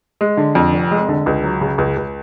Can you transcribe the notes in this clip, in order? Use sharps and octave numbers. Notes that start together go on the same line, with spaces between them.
G#3
D3
F2
F1
G#3
D3
C#2
F#3
C#3
C#2
C#2